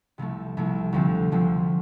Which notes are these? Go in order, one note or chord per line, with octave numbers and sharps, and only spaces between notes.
C2 C3 F3 A3
C2 C3 F3 A3
D2 D3 F3 C4
D2 D3 F3 C4